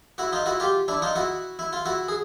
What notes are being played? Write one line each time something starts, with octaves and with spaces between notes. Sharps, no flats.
E4 F#4
D#4 F4
E4 F#4
F4 G4
D4 E4
D#4 F4
E4 F#4
E4
F4
E4 F#4
G#4